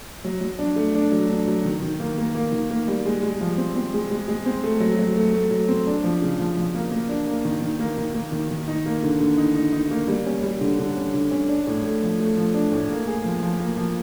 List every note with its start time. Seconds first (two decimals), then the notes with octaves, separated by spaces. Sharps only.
0.25 F#3
0.41 F#3
0.59 D4
0.76 A3
0.95 D4
1.12 F#3
1.29 D4
1.47 F#3
1.65 D#3
1.82 D#3
2.00 A#3
2.18 A#3
2.35 A#3
2.52 D#3
2.70 A#3
2.88 G3
3.05 G#3
3.23 G#3
3.41 F3
3.57 C4
3.76 C4
3.94 G#3
4.11 G#3
4.28 G#3
4.46 C4
4.64 A3
4.80 F#3
4.99 F#3
5.16 A3
5.33 A3
5.51 F#3
5.68 C4
5.87 D4
6.04 F3
6.22 C#3
6.39 F3
6.57 F3
6.75 A#3
6.91 A#3
7.09 D4
7.27 A#3
7.45 D#3
7.62 D#3
7.79 A#3
7.97 D#3
8.14 A#3
8.32 D#3
8.51 D#3
8.68 D#4
8.86 A#3
9.03 D3
9.20 D3
9.37 D#4
9.55 D#4
9.73 D#4
9.91 A#3
10.08 G3
10.26 C#4
10.43 G3
10.61 D3
10.79 D3
10.97 C#4
11.14 D3
11.31 C#4
11.48 D4
11.67 A2
11.83 A3
12.02 F3
12.20 A3
12.37 F3
12.54 D4
12.72 A2
12.90 A#3
13.07 G#4
13.24 F3
13.43 F3
13.60 A#3
13.77 F3